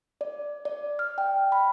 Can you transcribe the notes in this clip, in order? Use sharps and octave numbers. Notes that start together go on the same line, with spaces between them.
D5
D5
F6
G5
B5